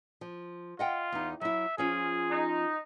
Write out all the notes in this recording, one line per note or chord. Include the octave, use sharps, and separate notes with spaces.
F3
F4 D#5 F#5 G5
E2 D#4
F#3 E4 E5
F3 C#4 F4 G#4
D#4